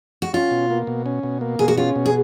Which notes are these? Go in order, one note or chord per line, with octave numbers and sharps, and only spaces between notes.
F#4
C#4 F4
B2
A#3
B2
C#4
B2
A#3
B2 G#4
F#4
C#4 F4
B2
G#4